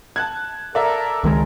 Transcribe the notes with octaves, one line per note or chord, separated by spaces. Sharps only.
A5 F#6 G#6
A4 A#4 D5 E5
C#2 D#3 G#3 A#4